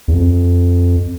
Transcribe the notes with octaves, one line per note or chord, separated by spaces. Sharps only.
E2
F2